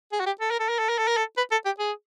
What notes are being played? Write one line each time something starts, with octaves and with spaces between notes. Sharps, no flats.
G#4
F#4
G4
A4
A#4
A4
A#4
A4
A#4
A4
A#4
A4
B4
A4
G4
G#4